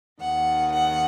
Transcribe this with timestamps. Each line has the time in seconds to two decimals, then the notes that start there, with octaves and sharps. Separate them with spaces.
0.20 D#2 D#3 F#5
0.71 F#5